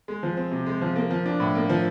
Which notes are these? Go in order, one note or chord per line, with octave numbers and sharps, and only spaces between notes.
G#3
F3
C4
C3
G#3
F3
A#3
F3
D4
A2
A#3
F3